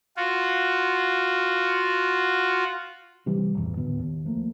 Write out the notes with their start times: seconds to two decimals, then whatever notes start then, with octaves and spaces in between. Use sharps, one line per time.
0.17 F4 F#4
3.26 C3 E3 G3 C4
3.54 A1 E2
3.77 D2 A2 D3 B3
3.99 D#2
4.25 F3 A3 A#3